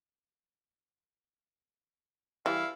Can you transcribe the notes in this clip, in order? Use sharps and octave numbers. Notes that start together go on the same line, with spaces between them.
E3 G3 E4 F5